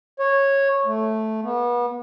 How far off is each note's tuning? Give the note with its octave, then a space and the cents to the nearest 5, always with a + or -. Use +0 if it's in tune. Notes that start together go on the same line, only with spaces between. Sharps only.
C#5 -10
A3 -5
B3 -35